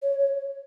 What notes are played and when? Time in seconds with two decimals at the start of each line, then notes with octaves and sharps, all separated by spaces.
0.02 C#5
0.19 C#5